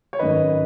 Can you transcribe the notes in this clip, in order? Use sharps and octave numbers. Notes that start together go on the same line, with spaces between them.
C#5
G#1 F#2 D#3 B4 D#5